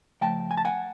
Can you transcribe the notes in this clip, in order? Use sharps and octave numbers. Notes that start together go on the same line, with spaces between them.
C#3 F3 A3 G5 A5
G#5
A5
F#5 G#5